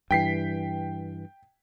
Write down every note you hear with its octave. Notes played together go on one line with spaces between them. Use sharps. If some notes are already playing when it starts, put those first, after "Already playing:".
G2 E3 G5 B6 C7